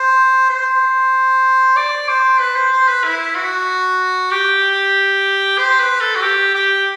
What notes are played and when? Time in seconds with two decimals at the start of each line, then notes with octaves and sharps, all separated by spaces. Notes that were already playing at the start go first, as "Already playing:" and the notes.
Already playing: C5
0.50 C5
1.76 D5
2.08 C5
2.41 B4
2.56 C5
2.72 C5
2.88 B4
3.04 E4
3.36 F#4
4.31 G4
5.58 C5
5.80 B4
6.01 A4
6.15 F#4
6.22 G4
6.54 G4